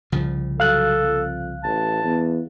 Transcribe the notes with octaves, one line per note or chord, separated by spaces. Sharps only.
C2 C#3 F3
F#3 A4 F5 F#6
F2
A1 A5
E2